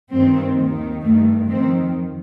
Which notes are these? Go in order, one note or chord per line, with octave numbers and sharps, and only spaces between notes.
G2 D#3 C4
D#2 D#3
G2 D#3 A3
F2 D#3 C4